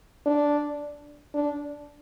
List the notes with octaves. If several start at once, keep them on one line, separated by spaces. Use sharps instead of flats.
D4
D4